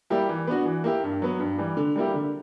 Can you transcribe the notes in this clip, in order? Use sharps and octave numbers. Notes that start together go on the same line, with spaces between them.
G3 A#3 E4 G4
E3
B3 D4 F#4
E3
A#3 E4 G4
G2
F#3 B3
G2
E3 G3
D3
G3 A#3 E4 G4
D3